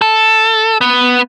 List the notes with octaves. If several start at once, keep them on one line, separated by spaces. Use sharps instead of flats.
A4
B3